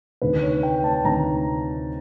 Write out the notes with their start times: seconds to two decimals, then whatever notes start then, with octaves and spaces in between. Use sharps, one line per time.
0.22 D2 C3 D#3 B4
0.43 C#5
0.63 G5
0.84 A5
1.05 D2 C3 D#3 A#5